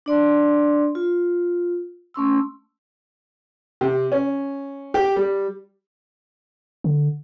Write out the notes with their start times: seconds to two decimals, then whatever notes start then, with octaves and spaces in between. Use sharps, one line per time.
0.06 D4 D5 C6
0.95 F4
2.14 A3 C#4 C6 E6
3.81 C3
4.12 C#4
4.94 G4
5.16 G3
6.84 D3